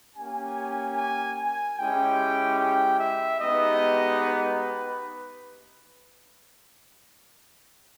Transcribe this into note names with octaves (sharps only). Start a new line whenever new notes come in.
A#3 C#4 G4 G#5
G#5
G#5
G#3 C#4 E4 G4 G5
G5
E5
G#3 B3 D#4 G4 D#5
B4